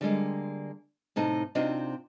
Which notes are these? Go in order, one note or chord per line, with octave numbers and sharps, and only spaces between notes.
D3 G3 G#3 A#3
A2 C3 D#4 A5
C3 C4 D4 D#4 F4 F#4